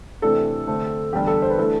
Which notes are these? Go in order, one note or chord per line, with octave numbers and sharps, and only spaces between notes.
C3 E3 A3 D4 A4
D3 A3 C4
E2 D3 G3 D4 G4
A4
C5
B4
E3 A3 D4 A4